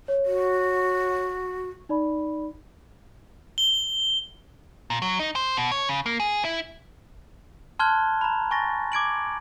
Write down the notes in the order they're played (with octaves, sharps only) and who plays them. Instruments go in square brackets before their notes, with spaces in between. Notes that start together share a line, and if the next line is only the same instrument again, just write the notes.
[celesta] C#5
[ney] F#4
[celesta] D#4 D5 B5
[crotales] G7
[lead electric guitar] A#2
F#3
D#4
C5
B2
C#5
C#3
A#3
G#4
E4
[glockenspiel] A5 C6 F6 F#6 G#6 G7
A#5 B5
G#5 C#6 A6 A#6
D6 G#6 D7 F#7